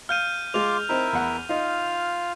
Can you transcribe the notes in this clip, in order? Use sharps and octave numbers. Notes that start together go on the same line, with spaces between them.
F5 F6 G6 D#7
G#3 F4 C6 D6 F7
C4 D#4 E4 A#4 E5
E2 F#5
D#4 F4 F5